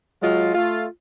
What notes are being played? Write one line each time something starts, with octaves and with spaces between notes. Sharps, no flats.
F#3 G#3 F4
A3 F4